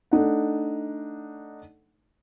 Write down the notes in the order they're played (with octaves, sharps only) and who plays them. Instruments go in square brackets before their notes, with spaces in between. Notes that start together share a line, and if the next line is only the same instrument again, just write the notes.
[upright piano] A3 D4 D#4 F#5